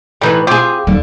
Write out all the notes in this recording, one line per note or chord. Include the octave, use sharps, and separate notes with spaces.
A2 E3 G3 D#4 B4
C4 F4 G4 G#4
D#2 D3 G3